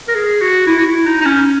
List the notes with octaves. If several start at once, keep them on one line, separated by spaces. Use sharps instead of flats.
A#4
G#4
F#4
E4
F#4
E4
D#4
D#4
C#4